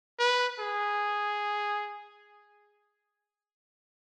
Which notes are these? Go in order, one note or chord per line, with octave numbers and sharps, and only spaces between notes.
B4
G#4